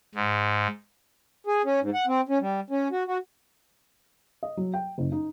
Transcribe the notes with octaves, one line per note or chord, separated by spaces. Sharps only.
G#2
G#4
C#4
G#2
F#5
C4
C#4
G3
C#4
F#4
F#4
D#5
F#3
G5
F#1
D#4